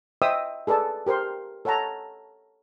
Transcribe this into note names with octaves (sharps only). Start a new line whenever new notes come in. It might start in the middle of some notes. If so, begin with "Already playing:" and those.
C5 D#5 E5 G5 D#6 E6
G#4 A4 B4 D5 A5
G4 A#4 C5 C6
A4 C#5 F#5 A5 A#5